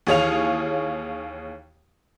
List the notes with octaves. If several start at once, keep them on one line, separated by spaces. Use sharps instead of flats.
D#2 E3 G#4 C#5 F5 F7